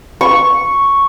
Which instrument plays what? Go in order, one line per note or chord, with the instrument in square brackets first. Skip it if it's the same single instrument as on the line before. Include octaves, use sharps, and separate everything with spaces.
[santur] C#6